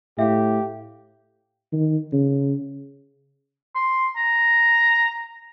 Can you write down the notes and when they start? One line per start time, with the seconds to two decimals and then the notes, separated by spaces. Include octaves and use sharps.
0.19 A2 G4 E5 F5
1.73 D#3
2.13 C#3
3.75 C6
4.16 A#5